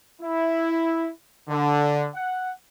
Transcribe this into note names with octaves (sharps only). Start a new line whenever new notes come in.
E4
D3
F#5